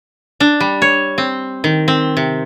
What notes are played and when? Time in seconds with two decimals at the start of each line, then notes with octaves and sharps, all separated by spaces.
0.40 D4
0.60 G3
0.82 C#5
1.18 C4
1.64 D#3
1.88 C4
2.17 C3